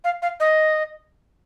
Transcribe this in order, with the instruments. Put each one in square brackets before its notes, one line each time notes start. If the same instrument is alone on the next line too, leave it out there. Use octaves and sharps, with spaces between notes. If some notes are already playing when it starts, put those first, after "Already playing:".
[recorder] F5
F5
D#5